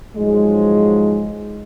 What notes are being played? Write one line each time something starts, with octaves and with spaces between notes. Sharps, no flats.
G#2 F3 F#3 G#3